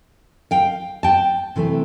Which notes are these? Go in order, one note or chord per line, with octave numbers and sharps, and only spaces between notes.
F5 G5
G5 A5
C3 E3 A3 C4